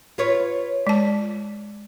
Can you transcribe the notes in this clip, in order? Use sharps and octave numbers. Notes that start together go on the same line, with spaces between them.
F4 B4 C#5
G#3 A5